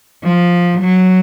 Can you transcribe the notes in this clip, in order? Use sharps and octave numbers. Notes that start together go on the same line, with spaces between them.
F3
F#3